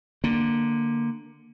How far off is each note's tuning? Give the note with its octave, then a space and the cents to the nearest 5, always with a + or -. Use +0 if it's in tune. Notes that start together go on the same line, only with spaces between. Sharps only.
D3 +10 A#3 +0